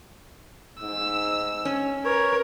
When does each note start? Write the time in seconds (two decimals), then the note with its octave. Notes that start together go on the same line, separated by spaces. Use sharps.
0.82 G#2 E6
1.65 C#4
2.05 A#4 B4 C#5